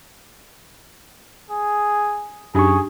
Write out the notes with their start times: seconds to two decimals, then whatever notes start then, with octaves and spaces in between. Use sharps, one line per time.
1.50 G#4
2.55 F#2 D4 D#4 G4 G#4 C#6